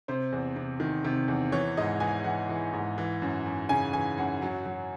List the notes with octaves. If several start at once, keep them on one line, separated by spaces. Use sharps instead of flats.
C3 C5
E2
C3
D#3
C3
E2
E3 C#5
G#2 D#5
E3 G#5
E3 F#5
E3
G#2
E3
F#2
F#2
C#3 G#5
E3 G#5
F#2 F#5
F#3
F#3